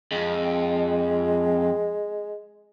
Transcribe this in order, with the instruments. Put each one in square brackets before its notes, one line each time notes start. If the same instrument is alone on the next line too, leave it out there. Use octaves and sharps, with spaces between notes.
[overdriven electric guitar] F2 [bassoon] G#3